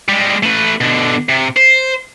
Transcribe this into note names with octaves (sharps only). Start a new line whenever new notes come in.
G3 G#3
A3 B4
B2 D3
C3
C5